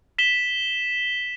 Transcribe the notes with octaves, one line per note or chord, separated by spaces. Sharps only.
B6 E7 G7